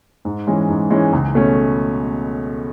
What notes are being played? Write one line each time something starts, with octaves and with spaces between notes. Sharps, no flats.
G#2
E3 G#3 C#4
G#2
E3 G#3 C#4
C#2
B2 A3 C#4